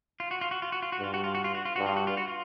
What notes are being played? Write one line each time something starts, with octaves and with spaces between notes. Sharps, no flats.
F4
F#4
F4
F#4
F4
F#4
F4
F#4
G2 F4
F#4
F4
F#4
F4
F#4
F4
G2 F#4
F4
F#4
F4
F#4
F4